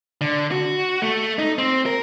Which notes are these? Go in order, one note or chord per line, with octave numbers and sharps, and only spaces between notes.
D3
F#4
A3
D#4
C4
A#4